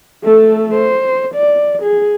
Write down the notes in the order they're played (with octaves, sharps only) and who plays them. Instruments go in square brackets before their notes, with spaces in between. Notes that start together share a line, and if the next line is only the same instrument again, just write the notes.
[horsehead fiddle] A3 A4
C5
D5
G#4